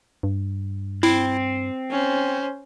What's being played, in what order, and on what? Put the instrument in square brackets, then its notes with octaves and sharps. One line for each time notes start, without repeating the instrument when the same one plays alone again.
[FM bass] G2
[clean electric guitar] C4 [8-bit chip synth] E4
[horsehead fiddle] C#4 C5